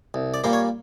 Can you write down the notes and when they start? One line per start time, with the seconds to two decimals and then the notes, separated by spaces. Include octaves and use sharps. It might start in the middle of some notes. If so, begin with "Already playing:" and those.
0.14 C2
0.34 D5
0.44 A#2 G3 A#3 C5
0.53 C#5